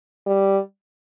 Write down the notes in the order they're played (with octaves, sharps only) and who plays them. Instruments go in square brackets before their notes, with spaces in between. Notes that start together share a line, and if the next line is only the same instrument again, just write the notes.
[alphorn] G3